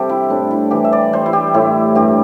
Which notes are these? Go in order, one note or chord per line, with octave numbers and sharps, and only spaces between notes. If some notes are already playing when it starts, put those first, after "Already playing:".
Already playing: C3 G3 G4 A4 C5 E5
E4
A2 D4
E4
E3 G4
E5
D5
G3 C5
E4
G4
A2 E4
G2 G4